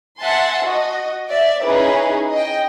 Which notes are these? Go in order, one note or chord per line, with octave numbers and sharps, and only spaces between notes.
E5 F#5 G#5 A5 C6
F#4 D#5
D5 E5
C#4 D#4 E4 G#4 B4
D#5 G5